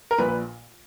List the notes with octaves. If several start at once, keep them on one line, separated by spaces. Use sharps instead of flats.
A#4
A#1 A#2 B4
B4